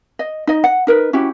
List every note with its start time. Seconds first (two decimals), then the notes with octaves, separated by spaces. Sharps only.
0.19 D#5
0.47 D#4 D#5
0.64 F#5
0.87 D#4 A#4 B4
1.13 C#4 E4 F#4 G4